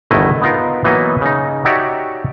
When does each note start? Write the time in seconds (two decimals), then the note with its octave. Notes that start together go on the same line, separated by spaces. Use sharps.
0.10 G1 E2 D#3 A3 E4 D#5
0.42 B3 D#4 F4 A#4
0.84 E3 F#3 A#3 B3 D#4 D#5
1.21 C#3 D#4
1.65 D#4 F#4 G4 C#5 D5 E5